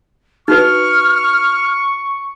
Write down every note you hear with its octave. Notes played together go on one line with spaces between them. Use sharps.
D#4 F#4 B4 C#6 F6